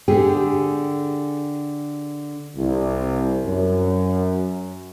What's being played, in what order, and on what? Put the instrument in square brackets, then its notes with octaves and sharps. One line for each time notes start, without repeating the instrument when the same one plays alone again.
[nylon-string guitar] D3 G4 G#4
[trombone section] C2
F#2